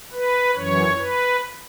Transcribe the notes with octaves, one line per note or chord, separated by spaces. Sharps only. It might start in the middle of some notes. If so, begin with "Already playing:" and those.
B4
F#2 E3 C#5
B4